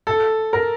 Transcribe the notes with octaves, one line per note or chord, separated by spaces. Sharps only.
A4
A#4